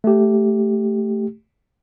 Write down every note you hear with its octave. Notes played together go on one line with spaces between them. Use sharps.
A3 G4